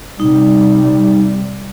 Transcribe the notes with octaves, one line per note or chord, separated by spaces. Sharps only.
C3 G3 D#4